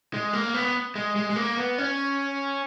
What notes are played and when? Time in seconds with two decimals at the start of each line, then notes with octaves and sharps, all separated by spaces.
0.14 G#3
0.33 A#3
0.54 B3
0.96 G#3
1.16 G#3
1.30 G#3
1.36 A#3
1.57 B3
1.78 C#4